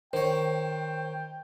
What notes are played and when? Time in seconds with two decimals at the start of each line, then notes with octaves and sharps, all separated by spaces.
0.13 D#3 C5 C#5 G5